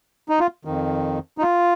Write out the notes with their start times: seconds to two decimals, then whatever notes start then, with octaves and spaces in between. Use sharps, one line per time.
0.29 D#4
0.39 F4
0.65 F2 D#3
1.38 D#4
1.42 F4